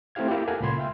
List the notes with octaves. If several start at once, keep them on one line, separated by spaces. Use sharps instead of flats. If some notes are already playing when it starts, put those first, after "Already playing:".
A3 C4 E4 G4 F5 G#6
A#3 E4 F4 G4
A4 A#4 F5 F#5 G#5
C#2 A#2 B5 C6 G#6
E5 F5 G5 C6